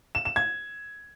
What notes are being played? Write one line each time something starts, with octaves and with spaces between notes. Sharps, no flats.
E7
E7
G#6